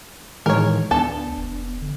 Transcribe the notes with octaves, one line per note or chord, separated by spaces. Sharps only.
A2 D#3 E3 G#3 A#4 C#5
D2 B3 D4 A4 A5
F1
D3